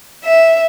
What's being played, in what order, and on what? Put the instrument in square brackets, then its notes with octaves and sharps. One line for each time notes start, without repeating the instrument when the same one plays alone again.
[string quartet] E5